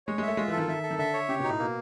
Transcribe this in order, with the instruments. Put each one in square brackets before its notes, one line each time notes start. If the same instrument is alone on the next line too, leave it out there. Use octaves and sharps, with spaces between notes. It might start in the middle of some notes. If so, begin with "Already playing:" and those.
[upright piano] G#3 [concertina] C#5
[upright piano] G#3 [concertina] E5
[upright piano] A3
[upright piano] G#3 [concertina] F4
[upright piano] E3 [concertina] A4
[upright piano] D#3
[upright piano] D#3 [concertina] E5
[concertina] A4
[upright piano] D#3
[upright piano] D3 [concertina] E5
[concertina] C#5
[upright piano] C#3 [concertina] G4
[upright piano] B2 [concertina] D#4
[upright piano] A2
[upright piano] B2 [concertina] A#3